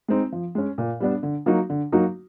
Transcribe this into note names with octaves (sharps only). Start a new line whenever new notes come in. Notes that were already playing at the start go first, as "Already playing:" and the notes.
G#3 C4 D#4
F3
G#3 C#4
A#2
G3 B3 D4
D3
F#3 A#3 D#4 F#4
D3
F#3 A#3 D#4 F#4